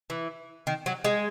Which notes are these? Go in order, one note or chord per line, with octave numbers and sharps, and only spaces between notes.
E3
D#3
F#3
G#3